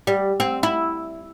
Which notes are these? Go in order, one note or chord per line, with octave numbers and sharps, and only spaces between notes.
G3
C4
E4